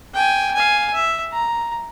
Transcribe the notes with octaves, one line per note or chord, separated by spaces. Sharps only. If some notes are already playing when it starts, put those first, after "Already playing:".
G5 G#5
F5 G#5
E5
A#5